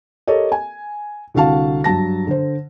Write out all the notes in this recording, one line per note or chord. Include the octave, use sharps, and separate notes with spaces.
G4 A4 A#4 C#5 D#5
G#5
C2 D3 F#4 F5 A5
G2 F#3 A5 A#6
D3 C5